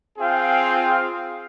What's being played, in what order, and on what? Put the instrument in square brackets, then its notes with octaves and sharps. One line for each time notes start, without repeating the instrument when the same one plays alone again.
[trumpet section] C4 F4 G#4 F5 G5